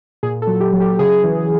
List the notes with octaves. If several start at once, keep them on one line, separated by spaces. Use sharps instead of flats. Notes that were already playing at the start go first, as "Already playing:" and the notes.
A#2 G#4
A4
F#3
G4
F#3
G4
C#3 G#4
E3